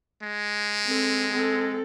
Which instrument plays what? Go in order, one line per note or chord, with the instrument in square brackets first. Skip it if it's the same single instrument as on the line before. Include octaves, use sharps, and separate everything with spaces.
[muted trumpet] G#3
[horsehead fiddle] C4 A4
C4 A4